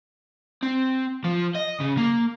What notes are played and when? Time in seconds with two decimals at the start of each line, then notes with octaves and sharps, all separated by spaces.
0.63 C4
1.25 F3
1.56 D#5
1.80 C#3
1.97 A#3